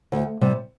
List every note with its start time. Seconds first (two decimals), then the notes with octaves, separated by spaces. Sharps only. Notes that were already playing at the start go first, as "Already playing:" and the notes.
0.12 D2
0.41 C3 G3